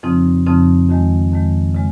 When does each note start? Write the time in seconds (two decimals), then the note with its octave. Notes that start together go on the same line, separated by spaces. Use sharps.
0.03 F2 C#3 F3 C4 D#4
0.46 F2 C#3 F3 C4 D#4
0.89 F2 D#3 G#3
1.32 F2 D#3 G#3
1.75 C#3 G#3